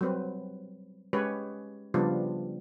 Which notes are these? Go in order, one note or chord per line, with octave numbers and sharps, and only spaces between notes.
F#3 G3 C4 B4
G#3 C#4 G4 B4 C#5
C#3 F3 G3 B3 D4 F4